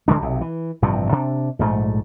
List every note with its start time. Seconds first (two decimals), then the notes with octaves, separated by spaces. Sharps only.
0.08 D1 D3 G#3 D4
0.22 B1 C3
0.41 E3
0.82 A1 G2 C3 F3
1.12 C3 D4
1.59 A#1 G#2 F3 A3